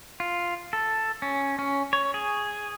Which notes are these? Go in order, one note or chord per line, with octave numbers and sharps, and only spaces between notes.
F4
A4
C#4
C#4
C#5
G#4